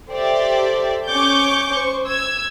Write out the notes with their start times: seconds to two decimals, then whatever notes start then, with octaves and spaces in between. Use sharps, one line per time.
0.10 G4 A4 C5 D5 E5
1.08 C#4 C#6 D6 G6
1.72 C5 C#6
2.07 E6 G#6